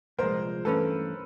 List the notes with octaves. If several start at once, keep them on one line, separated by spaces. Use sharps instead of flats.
C2 A#2 F3 G#3 A#4 C5
G2 E3 A3 C#4 A4 B4